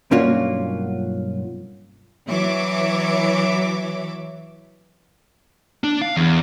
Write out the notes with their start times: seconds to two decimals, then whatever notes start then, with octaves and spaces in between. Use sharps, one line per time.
0.11 B1 G2 A#3 C#4 F4 F#4
2.29 E3 F#3 C#5 E5 D6
5.84 D4
6.02 F5
6.17 E2